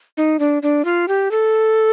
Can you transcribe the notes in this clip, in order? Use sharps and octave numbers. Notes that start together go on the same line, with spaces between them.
D#4
D4
D4
F4
G4
A4